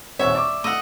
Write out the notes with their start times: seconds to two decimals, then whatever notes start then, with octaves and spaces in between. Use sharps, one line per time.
0.19 D#1 C4 C#5 E5 F#5
0.35 D5 C#6 D6
0.64 A3 D#5 F#5 E6